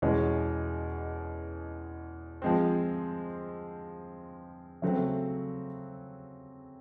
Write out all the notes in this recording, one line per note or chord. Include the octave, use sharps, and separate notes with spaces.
E2 B2 G#3 C#4
F3 G#3 C4
C#3 F#3 A3 C4